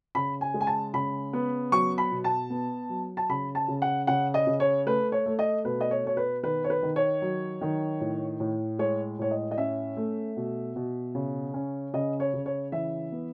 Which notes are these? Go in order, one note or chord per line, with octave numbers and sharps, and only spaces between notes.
C#3 B5
G#5
G#3
G#5
A5
C#3 B5
B3
F#3 C#6
B5
B2
A5
B3
F#3
A5
C#3 B5
A5
C#3
F#5
C#3 F#5
D#5
C#3
C#5
A3 B4
C#5
A3
D#5
B2 B4
D#5
C#5
B2 C#5
B4
D#3 B4
C#5
B4
D#3
C#5
F#3
D#3
A2
A2
G#3 C#5
A2 C#5
D#5
D#5
C#4 E5
A3
B2
B2
C#3
C#4
C#3 D#5
C#5
C#3
C#5
E3 E5
B3